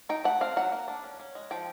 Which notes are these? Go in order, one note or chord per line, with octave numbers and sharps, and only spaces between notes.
D#4 G5
A3 F#5
C4 F5
F#3 F#5
A#3
D4
C#4
C#4
G#3
F3 G5